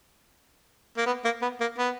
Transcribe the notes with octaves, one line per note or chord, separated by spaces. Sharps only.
A#3
B3
A#3
B3
A#3
B3